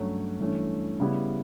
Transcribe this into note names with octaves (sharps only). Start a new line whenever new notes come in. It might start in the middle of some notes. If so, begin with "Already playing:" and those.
Already playing: G2 F#3 A3 C#4 F#4
G2 E3 A3 C#4
C#3 G3 B3 E4 G4